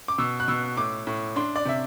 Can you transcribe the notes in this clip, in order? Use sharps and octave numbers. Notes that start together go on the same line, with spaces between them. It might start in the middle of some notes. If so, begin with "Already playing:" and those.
D6
B2 E6
F#6
B2 E6
A2 D6
A2
D4 C6
D5
C3 E5